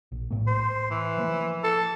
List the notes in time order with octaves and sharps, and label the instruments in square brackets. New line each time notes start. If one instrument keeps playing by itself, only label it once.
[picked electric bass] A#1
A2 A3 A#3
[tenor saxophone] C5
E3
[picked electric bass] F3 A3 A#3
[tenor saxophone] A4